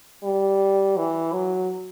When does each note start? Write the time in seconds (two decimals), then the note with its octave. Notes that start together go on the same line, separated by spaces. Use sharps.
0.24 G3
0.98 E3
1.33 F#3